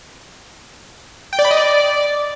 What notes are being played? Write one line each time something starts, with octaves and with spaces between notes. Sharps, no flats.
G5
D5
B5
D#5
D5